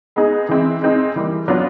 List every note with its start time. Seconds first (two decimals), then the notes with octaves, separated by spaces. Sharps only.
0.16 G#3 B3 D#4 G#4
0.49 E3 G#3 C4 E4
0.82 G#3 C4 D#4 G#4
1.16 E3 G3 A#3
1.48 F#3 B3 D4 F4